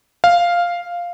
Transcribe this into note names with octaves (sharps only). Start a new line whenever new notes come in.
F5